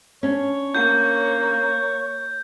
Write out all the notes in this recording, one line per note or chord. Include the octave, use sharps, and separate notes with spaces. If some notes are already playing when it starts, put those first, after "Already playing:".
C#4 D4 C#5
A#3 G6